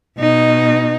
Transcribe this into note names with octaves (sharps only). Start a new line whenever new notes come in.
B2 D#4